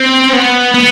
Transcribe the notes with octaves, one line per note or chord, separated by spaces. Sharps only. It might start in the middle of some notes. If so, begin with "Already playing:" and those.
Already playing: C4
B3
B3